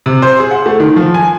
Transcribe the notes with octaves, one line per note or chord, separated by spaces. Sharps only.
C3
C5
G#4
F#5
A3
D#3
F3
G#5